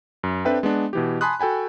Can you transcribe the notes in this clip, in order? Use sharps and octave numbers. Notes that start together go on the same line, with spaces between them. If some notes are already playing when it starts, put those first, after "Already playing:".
F#2
C4 D4 A4 B4 E5 G5
G#3 B3 D4
B2 E3 G4
G#5 A5 B5 C6 D#6 F#6
F#4 A4 G5 G#5 B5